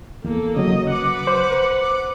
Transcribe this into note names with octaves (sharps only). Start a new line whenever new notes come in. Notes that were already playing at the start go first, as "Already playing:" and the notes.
E2 A#3 A4
C#3 F#3 D#5
B4 F#5 D6
C5
D6